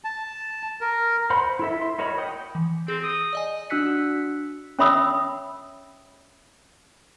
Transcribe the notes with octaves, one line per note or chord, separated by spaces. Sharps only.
A5
A#4
C5 F#5 B5 C6
E4 A4 E5
C6
D#4 F#4 A#4 C#5 B5
F#5 G5 D#6
E3
C4 G#4 A#6
D#6
D5 D#5 G#5
D4 F#4 E6 F#6 B6 C#7
C#4 C#5 E5 B5 D#6 E6